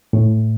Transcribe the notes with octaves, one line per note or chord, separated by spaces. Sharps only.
A2